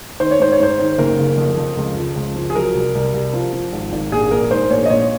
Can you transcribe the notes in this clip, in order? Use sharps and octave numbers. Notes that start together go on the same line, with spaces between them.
D#3 C5
C#5
G#2 C5
C#5
G#2 C5
D#3
F#1 A#4
C#3
F2
F2
C#2
F3
C#2
F3
G#4
F#3 A#4
C2
C2
C2
F3
F3
G#1
G#1
A#1 G#4
A#1 A#4
G#2 C5
A#1 C#5
D#5
A#2 C#5